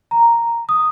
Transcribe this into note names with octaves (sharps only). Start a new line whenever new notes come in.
A#5
D#6